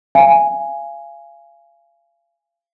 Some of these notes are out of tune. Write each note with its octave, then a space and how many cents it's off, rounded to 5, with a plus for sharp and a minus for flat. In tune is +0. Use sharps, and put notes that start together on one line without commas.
F5 -35 G#5 +0